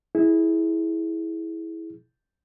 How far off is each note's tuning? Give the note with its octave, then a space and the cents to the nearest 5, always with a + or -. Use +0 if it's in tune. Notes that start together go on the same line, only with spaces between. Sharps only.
E4 -10 G#4 +10